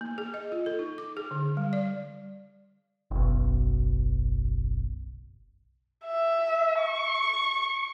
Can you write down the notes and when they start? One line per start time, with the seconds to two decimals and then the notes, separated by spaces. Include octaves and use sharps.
0.01 A#3
0.18 G#4
0.34 D#5
0.52 F4
0.66 A4
0.79 D#4
0.98 D6
1.17 G#4
1.31 D3
1.57 G3
1.73 D5
3.11 F#1 B1
6.05 E5
6.80 C#6